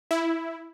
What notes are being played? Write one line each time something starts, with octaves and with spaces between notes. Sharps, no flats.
E4